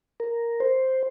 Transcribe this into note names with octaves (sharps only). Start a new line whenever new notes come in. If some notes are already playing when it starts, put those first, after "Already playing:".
A#4
C5